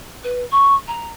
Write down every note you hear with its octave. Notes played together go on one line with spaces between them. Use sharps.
B4
C#6
A#5